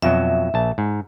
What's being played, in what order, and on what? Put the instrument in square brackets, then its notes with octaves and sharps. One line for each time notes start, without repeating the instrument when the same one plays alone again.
[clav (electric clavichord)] F2 B2 F#3 [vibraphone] E5
[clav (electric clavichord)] A#1 A5
G#2